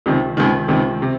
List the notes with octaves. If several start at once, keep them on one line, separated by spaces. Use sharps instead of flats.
C#2 C3 D#3
C#2 C3 D#3
C#2 C3 D#3
C3